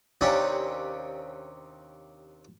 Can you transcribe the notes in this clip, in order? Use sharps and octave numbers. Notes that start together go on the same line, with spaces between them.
D#2 C3 C#4 D4